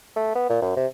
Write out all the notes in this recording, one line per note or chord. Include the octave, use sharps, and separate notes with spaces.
A3
B3
A#2
F#2
C3